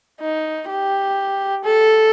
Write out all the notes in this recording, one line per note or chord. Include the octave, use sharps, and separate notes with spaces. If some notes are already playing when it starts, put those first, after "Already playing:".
D#4
G4
A4